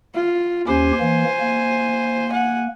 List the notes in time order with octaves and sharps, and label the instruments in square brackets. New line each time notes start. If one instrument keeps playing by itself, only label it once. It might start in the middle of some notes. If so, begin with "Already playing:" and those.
[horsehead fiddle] F4
[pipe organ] D#2 C#4 G4 [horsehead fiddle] C5 G#5
[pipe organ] E3 A#3
A#3
[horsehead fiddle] F#5 G#5